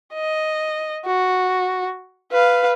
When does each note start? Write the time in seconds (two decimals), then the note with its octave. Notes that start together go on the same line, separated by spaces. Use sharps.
0.14 D#5
1.06 F#4
2.32 B4 F5